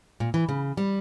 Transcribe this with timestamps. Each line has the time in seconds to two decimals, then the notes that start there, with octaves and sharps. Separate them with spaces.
0.20 A#2
0.34 E3
0.49 C#3
0.77 G3